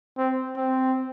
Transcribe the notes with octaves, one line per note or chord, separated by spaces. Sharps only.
C4
C4